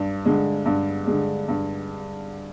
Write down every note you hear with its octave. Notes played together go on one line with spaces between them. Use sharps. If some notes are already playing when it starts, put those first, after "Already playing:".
Already playing: G2
D3 G#3
G2
D3 G#3
G2